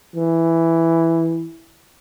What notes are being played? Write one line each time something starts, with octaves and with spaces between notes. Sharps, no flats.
E3